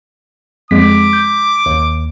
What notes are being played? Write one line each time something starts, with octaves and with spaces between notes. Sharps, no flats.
F2 G#3 D6 B6
G6
D#2